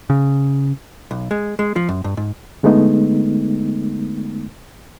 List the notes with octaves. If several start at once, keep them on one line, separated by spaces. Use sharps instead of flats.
C#3
B1
G#3
G#3
F3
F#2
G2
G#2
D3 G#3 A3 B3 D#4